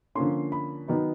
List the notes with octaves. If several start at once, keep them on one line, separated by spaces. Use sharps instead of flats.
D3 F3 A#3 C#4 C6
B5
D#3 F#3 B3 D#4